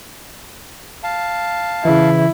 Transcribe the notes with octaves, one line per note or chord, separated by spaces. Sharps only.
F5 A5
C#3 E3 E4